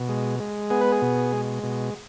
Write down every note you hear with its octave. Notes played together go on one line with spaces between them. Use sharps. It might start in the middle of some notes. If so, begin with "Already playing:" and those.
Already playing: B2
G#3
G#3
B3 G#4
B4
G#4
B2
G#3
B2